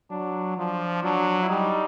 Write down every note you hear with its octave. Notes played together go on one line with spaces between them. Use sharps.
F#3 D4
F3 D4
F#3 D4
E4
G3 D#4